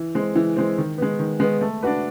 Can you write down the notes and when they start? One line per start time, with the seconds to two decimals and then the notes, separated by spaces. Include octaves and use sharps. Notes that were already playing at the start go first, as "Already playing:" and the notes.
Already playing: E3
0.15 G#3 C4
0.35 E3
0.56 G#3 C4
0.78 D#3
0.98 G#3 B3
1.19 D#3
1.40 G#3 B3
1.61 A3
1.82 D4 F#4 B4